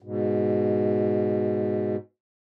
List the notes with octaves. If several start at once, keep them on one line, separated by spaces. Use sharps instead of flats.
G#2 B2